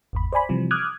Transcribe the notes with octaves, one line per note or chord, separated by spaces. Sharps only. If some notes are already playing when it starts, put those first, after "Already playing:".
G#1 E2 B5
C5 D5 G#5 B5
C3 E3 F3 G3
D6 D#6 F6 F#6 G#6